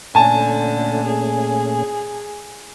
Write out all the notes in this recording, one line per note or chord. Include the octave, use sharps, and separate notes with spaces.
A#2 D3 A3 C#4 G#5 A5
G#4